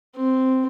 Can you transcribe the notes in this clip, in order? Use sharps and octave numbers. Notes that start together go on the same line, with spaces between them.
C4